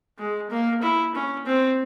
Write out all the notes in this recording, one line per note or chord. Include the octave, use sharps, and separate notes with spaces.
G#3
A#3
E4
C#4
C4